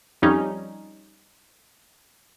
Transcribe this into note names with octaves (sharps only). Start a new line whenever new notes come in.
F2 G3 C#4 D#4